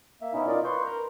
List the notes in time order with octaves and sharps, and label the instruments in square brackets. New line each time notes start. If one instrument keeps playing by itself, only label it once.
[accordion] A#3 E5
B2 C#4 D#4 E4
D#4 F4 A#4 D5 D#5
B4 C6 C#6 G6
A#4 A#5